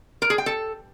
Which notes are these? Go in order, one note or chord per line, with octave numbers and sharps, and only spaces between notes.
A#4
G#4
G5
A4